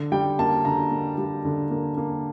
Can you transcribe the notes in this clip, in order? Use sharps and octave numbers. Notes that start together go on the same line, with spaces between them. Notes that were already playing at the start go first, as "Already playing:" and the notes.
Already playing: D3
G3 G5
A#3 A5
D3 A#5
A#3
G3
D3
A#3
A#3